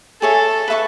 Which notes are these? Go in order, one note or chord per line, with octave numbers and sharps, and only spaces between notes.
G#4 A4 C#5 E5
B4 E5 A5 C#6